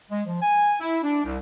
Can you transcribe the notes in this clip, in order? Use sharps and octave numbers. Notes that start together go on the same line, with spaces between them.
G#3
F3
G#5
E4
D4
C2